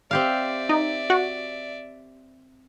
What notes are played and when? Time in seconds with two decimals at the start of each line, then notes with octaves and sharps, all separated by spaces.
0.11 C4 G4 D5 E5 F5
0.69 D#4
1.10 F#4